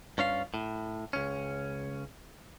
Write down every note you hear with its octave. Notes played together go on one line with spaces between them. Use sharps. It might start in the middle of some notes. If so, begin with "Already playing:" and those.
G2 C#4 F4 F5
A2
C#2 C#4